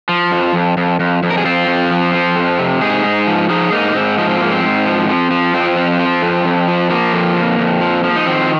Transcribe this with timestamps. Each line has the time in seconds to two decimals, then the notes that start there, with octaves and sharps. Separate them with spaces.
0.09 F3
0.32 F2
0.54 F2
0.77 F2
1.00 F2
1.23 F2
1.30 A#4
1.38 G#4
1.45 F2 C4 F4
1.68 F2
1.91 F3
2.13 F3
2.36 F2
2.59 C3
2.81 G#2 D#4 G#4
3.04 G#2
3.27 F3
3.49 F3 D#4 G#4
3.72 G#2 A#3 D#4
3.88 A#3
3.95 G#2 C4
4.18 F3 D#4
4.29 C4
4.40 G#2 A#3
4.52 C4
4.63 G#2
4.86 F3
5.09 F3
5.31 F3
5.54 F2 C4
5.76 F3
5.99 F3
6.22 F2
6.45 F2
6.68 F3
6.90 F3 A#3
7.13 F2
7.36 F2
7.59 F2
7.81 F3
8.04 F3
8.16 D#4
8.27 D#3 C4